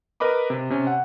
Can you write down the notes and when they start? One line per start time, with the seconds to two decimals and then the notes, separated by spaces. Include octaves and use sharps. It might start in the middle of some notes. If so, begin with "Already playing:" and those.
0.20 A#4 B4 D#5 B5 D6
0.50 C3
0.70 C3 C#4
0.87 F#5